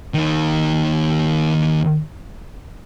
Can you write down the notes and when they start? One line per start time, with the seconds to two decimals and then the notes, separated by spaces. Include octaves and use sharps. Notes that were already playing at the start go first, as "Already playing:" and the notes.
0.14 D#2 D#3